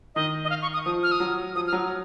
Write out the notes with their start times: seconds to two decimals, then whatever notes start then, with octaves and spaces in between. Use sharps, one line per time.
0.15 D#3 D#5
0.44 D#5
0.50 F5
0.62 C#6
0.74 D#6
0.85 F3 D#6
1.03 F6
1.12 D#6
1.20 F#3
1.56 F3 D#6
1.67 F6
1.73 F#3